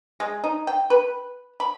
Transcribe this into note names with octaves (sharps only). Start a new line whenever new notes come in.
G#3
D#4
G5
B4
B5